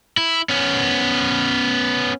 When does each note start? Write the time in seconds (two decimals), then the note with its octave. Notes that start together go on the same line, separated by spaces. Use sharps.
0.17 E4
0.49 B3 C#4